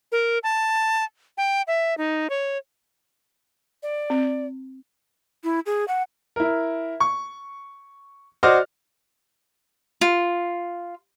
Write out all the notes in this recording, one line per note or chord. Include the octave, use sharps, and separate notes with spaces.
A#4
A5
G5
E5
D#4
C#5
D5
C4
E4
G#4
F#5
E4 A#4
C#6
F#4 C5 D5 D#5 F6
F4